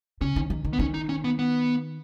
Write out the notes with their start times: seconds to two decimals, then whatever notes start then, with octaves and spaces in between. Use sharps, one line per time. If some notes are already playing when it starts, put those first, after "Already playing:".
0.21 C#3 C#4
0.36 D#3
0.50 D#3
0.65 D#3
0.73 B3
0.79 D#3 C#4
0.94 D#4
1.09 C#4
1.24 B3
1.39 B3